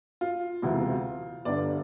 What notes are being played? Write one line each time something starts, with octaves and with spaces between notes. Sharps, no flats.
F4
E1 D2 C3 E3
G1 G2 D3 D5